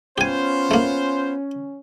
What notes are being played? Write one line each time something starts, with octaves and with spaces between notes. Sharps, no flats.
B3 C#4 F4 G4 C5 G#5
A3 A#3